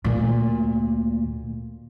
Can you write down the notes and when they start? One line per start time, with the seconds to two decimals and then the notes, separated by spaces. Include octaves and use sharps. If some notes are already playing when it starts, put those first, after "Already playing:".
0.04 D2 A#2